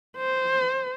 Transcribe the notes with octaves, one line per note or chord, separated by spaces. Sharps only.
C5